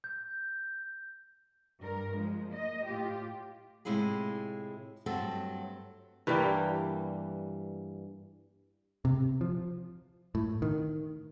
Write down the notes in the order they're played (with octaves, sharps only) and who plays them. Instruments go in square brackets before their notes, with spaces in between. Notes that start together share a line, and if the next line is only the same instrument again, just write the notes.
[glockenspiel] G6
[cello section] G2 A#4
F3 G#3
A#3 D#5
A2 F4 G4
[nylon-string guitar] A2 C3 G#3 E4 F4 G#4
G2 F#3 A3 C4 A4
[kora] G2 E3 G3 A#3
[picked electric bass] C3
F3
A2
D#3